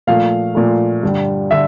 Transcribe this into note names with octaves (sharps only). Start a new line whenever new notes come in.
A#2 F3 A3 F5
A#2 F3 A3
G2 D3 G3
D3 E5